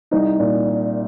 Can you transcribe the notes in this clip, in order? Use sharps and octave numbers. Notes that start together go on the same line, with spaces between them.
C2 D#4
A#2